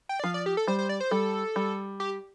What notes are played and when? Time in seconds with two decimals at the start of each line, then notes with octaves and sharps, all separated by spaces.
0.09 G5
0.20 D5
0.24 F3 F5
0.34 D5
0.46 G4
0.57 A4
0.67 G3 C5
0.79 C5
0.89 D5
1.00 C5
1.11 G3 A4
1.56 G3
2.00 G4